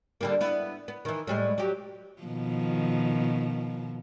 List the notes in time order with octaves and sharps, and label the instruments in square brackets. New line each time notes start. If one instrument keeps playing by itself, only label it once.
[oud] D3 G3 A#3
B3 D4 E4
B3
D#3 E3
A2 G3 G#3
F#3 G4
[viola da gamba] B2 D#3 F3